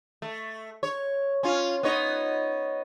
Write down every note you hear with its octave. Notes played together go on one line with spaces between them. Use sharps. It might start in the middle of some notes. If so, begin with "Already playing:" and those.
A3
C#5
C#4 F4
B3 D#4 C#5